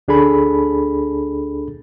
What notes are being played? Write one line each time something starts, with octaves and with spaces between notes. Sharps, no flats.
D2 D4 G#4 A4 B5